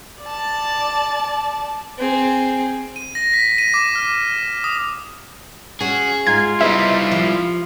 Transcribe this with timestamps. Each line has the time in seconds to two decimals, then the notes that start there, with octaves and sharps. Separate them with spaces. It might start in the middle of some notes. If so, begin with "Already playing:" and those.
0.23 D5 A5
1.98 C4 G#4
2.96 D#7
3.15 A#6
3.34 B6
3.58 D#7
3.74 D6
3.95 F6
4.15 E7
4.64 D#6
5.81 C#4 F#4 G#4
6.27 G#2 F4 G#6
6.61 G3 B3 D#4 E4 E5
7.11 F3